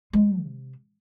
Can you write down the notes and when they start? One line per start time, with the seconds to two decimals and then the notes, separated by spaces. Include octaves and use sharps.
0.13 G#3
0.42 C3